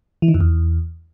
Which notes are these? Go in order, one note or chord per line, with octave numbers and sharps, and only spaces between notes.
E3
D#3
F2
E2